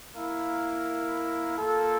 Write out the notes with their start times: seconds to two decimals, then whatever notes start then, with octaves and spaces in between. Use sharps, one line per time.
0.14 A#3 E4 A#4 F5
1.57 A#3 F4 A4